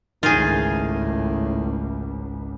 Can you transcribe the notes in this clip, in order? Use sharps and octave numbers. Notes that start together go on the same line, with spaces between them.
G#1 C#2 A2 D#3 F4 G#4